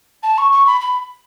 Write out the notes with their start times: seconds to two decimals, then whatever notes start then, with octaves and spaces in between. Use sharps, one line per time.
0.23 A5
0.37 C#6
0.51 C#6
0.66 B5
0.80 B5